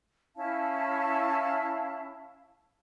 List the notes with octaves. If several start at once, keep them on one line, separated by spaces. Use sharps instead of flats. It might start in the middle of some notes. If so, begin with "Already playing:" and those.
C#4 E4 F5 A5